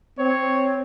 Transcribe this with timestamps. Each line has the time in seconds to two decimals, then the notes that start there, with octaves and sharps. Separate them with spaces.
0.19 C4 C#5